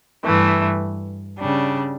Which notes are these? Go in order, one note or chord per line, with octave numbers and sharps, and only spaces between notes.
G2 E3 A3
C#3 G3 D4